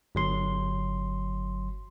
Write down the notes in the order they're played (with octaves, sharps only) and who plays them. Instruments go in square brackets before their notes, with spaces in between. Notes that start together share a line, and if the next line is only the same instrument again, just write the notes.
[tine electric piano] G1 F#3 C6